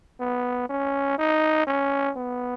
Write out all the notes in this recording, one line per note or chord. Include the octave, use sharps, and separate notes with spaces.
B3
C#4
D#4
C#4
B3